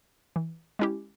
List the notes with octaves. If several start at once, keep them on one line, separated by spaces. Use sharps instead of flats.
E3
G#3 C#4 E4 G4